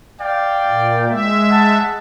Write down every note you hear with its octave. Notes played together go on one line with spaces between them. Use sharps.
D5 F5 G5
A#2
G#3 E5
F#5 A5